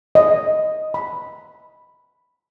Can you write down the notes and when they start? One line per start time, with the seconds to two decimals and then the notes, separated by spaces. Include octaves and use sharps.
0.15 D#5
0.94 B5